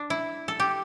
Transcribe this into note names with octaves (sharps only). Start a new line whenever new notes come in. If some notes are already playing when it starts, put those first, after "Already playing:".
Already playing: D4
E4
A4
G4